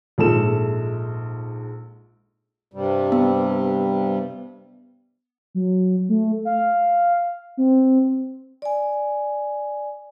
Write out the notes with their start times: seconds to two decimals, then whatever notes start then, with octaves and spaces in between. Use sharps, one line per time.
0.18 A#1 G#2 A4 E7
2.74 G2 C3 G3
3.12 B3
5.55 F#3
6.09 A3
6.45 F5
7.57 C4
8.62 D5 G#5